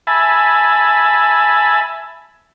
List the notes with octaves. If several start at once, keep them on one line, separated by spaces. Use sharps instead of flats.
E5 G#5 A5 B5